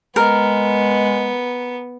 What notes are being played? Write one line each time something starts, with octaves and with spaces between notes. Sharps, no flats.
G#3 B3 A#4